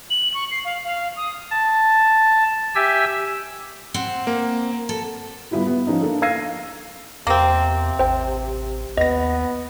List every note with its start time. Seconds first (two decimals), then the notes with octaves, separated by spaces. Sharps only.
0.10 F#7
0.34 C#6
0.51 C7
0.65 F5
0.84 F5
1.16 D#6
1.51 A5
2.75 G4 E5 G#5 E6
3.94 C4 F#5
4.27 A#3
4.89 A4
5.51 G3 B3 E4 F4 G4
5.67 B3
5.87 F3 C#4 D#4
6.02 A#3 D4 A4
6.22 F5 E6 G#6 A#6 C7 D#7
7.27 E2 C3 A#3 C4
7.99 A1 C5 G5
8.97 D#2 B3 D#5 A#6